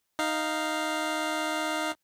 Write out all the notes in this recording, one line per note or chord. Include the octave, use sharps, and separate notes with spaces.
D#4 F5